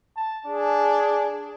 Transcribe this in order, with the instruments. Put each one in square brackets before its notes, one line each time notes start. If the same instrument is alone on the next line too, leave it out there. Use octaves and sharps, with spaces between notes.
[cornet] A5
[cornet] D4 [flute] G#4